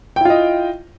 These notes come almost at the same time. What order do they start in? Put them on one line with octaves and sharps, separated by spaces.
G5 E4 F4 D#5